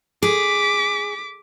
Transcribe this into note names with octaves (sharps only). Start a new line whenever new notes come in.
G#4 D6 B6